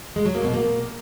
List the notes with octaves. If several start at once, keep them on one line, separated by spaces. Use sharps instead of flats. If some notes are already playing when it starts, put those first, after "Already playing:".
G#3
F#3
A#3
B2
A#3